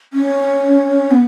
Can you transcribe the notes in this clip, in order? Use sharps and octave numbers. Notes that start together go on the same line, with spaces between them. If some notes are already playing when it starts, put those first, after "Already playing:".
C#4
B3